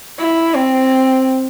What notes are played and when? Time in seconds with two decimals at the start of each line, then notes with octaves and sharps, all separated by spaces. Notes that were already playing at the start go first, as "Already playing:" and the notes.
0.19 E4
0.54 C4